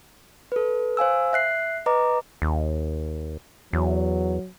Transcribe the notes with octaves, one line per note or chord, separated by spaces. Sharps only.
A4 B4
C5 F5 G#5 E6
E5 F#6 C7
B4 D#5 A#5 D6
D#2
E2 F#3